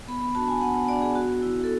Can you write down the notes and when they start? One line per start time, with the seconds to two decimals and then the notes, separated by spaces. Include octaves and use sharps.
0.08 B3 B5
0.22 B5
0.35 D4 F#4 A5
0.48 G#5
0.61 B3 F#5
0.88 D4 F#4 D5
1.02 G#4
1.15 B3 F#4
1.42 E4
1.64 A4